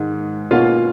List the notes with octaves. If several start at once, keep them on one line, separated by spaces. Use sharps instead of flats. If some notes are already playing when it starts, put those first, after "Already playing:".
Already playing: G#2 D#3 G#3
B2 A#3 C#4 F4 F5